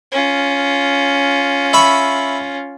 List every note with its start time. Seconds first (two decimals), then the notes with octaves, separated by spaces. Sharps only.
0.12 C#4 F4
1.73 E5 B5 C#6